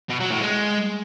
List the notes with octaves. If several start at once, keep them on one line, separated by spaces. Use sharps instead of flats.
B2
F#3
A2
G#3